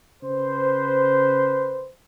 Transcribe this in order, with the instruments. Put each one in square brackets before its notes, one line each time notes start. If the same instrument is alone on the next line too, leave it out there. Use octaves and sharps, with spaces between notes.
[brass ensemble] C#3 B4 C5